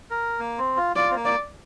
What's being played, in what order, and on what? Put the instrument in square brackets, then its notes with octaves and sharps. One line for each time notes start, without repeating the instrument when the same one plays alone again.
[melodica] A#4
A#3
C4
F4
[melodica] F4 [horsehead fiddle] D5
[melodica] C4
A#3
[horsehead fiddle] D5